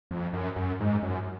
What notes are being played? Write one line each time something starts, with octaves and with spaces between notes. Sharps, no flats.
F2
F#2
F#2
G#2
F#2